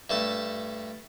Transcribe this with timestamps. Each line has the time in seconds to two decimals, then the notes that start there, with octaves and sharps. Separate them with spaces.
0.10 G2 A3 A5